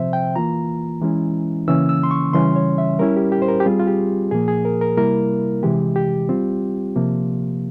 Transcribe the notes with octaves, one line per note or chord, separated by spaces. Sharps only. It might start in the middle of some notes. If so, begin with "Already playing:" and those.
Already playing: C3 F3 C4 C5 E5
G5
E3 A#3 F4 A#5
E3 G#3 C#4 E4
C#3 E3 A#3 C#4 E6
E6
C6
C#6
C#3 E3 G3 C#4 C6
C#5
E5
G3 C#4 E4 A#4
G4
G4
C5
A#4
G4
G3 C4 F4 G#4
F4
G4
A#2 F3 A#3 G#4
G#4
A#4
A#4
C3 G3 A#3 E4 A#4
C3 E3 G#3 G4
G4
G3 C4 F4
C3 F3 A#3